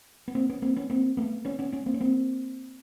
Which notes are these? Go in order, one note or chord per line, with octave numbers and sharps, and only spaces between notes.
B3
A#3 C4
B3 C#4
A#3 C4
B3 C#4
A#3 C4
A3 B3
B3 C#4
B3 C#4
B3 C#4
A#3 C4
C#4
A#3 C4